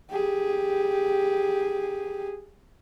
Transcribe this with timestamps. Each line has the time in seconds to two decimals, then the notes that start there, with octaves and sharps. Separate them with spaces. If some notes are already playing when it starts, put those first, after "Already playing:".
0.11 G4 G#4